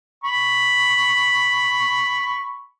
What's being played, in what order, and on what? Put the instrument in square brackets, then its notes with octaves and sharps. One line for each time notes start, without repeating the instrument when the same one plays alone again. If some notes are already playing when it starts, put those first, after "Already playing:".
[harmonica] B5 C#6